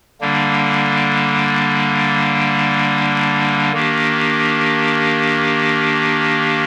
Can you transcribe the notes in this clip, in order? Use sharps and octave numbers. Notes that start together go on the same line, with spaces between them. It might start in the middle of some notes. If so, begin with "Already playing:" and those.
D3 G3 A#3 D4
D#3 A#3 D4 G4